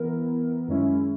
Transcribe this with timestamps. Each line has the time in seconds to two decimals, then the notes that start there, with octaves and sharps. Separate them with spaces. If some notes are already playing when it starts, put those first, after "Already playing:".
Already playing: E3 B3 E4 A#4
0.68 F#2 D#3 G#3 C#4 E4